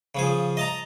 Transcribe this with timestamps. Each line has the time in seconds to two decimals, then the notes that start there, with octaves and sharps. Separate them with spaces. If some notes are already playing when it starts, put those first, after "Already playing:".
0.15 C#3 F3 G#4
0.57 D#5 A5 A#5